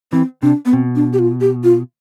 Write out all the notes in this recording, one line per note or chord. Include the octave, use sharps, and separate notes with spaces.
E3 C4
C3 D4
B3
B2 C4
D4
G4
F4
G4
F4